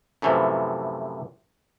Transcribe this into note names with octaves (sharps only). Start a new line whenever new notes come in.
F#2 A2 C3 E3 F3